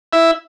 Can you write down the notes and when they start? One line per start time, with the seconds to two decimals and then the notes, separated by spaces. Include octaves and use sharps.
0.13 E4 E5